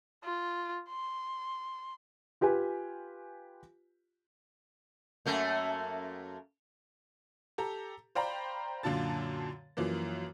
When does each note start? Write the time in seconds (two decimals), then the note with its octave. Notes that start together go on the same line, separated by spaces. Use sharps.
0.24 F4
0.90 C6
2.41 F4 G4 B4 G#5
5.26 F#2 A3 A#3
7.58 G4 A4 A#5
8.15 C5 D5 F5 G5 A#5 B5
8.83 F#2 A#2 D3 F4 A5 A6
9.77 F#2 E3 F3 A#3